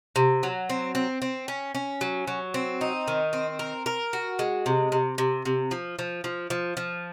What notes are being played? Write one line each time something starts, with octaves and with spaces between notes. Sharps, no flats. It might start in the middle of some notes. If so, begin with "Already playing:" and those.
C3
F#3
C4
C4
C4
C#4
C#4
F#3
F#3
C4
D#4
D#3
C4
A#4
A#4
F#4
G#3
C3
C3
C3
C3
F3
F3
F3
F3
F3